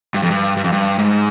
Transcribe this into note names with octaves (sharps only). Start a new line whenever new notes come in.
G2
F2
G2
G2
F2
G2
G#2